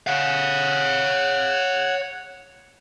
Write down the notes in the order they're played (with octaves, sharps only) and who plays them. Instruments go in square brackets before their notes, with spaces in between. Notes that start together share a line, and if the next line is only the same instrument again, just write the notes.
[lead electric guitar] C#5 F5 [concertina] F#5